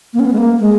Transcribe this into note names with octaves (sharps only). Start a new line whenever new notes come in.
A#3
C#4
B3
G#3
A#3
G#3